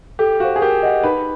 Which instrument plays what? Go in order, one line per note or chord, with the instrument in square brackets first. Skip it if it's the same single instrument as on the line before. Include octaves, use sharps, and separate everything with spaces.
[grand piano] G4 [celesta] A4
[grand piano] F#4 [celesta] C5 F5
[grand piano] G#4
[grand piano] G4 [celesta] A#4
[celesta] D#5 F#5
[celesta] D#4 [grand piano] B4